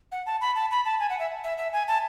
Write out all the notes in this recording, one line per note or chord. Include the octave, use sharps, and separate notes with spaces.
F#5
A5
B5
A5
B5
A5
G#5
F#5
E5
E5
E5
G#5
A5